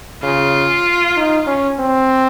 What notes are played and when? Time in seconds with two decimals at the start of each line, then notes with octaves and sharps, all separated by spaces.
0.22 C#3 F4
1.17 D#4
1.47 C#4
1.79 C4